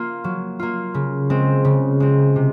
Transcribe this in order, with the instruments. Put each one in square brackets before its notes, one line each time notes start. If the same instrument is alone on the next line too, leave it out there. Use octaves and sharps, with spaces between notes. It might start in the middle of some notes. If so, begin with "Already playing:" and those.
Already playing: [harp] A#3 F4
F#3
A#3 F4
C#3
G#3 C4
C#3
G#3 C4
C3